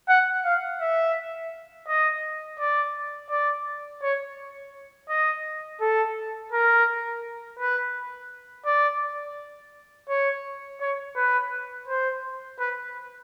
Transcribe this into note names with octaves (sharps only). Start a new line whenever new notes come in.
F#5
F5
E5
D#5
D5
D5
C#5
D#5
A4
A#4
B4
D5
C#5
C#5
B4
C5
B4